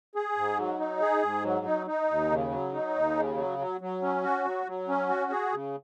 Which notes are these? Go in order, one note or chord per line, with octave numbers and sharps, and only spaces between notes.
G#4
G#2
F#3
D#4
G#4
G#2
F#3
D#4
D#4
D#2
C#3
F#3
D#4
D#2
C#3
F#3
F#3
F#3
C#4
F#4
F#3
F#3
C#4
F#4
G#4
C#3